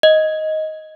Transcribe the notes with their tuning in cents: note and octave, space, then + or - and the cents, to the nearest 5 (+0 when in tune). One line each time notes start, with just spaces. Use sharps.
D#5 +10